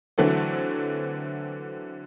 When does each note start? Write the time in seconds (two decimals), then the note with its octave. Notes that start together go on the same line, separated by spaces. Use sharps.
0.18 D3 E3 F#3 A3 C4